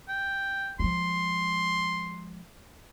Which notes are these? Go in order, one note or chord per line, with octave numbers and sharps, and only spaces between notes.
G5
F3 G#3 C6